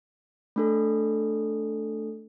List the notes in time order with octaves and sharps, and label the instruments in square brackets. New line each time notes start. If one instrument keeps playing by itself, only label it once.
[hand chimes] A3 D4 A4